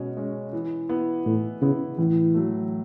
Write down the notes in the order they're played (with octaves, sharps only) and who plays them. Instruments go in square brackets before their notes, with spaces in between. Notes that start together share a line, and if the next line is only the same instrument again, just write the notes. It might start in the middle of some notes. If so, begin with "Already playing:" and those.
Already playing: [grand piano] B2 G#3 C#4
G#3 C#4
E3
B3 E4
[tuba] A2 [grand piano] E3
[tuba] C#3 [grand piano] B3 E4
[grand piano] A2 [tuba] E3
[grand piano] F#3 A3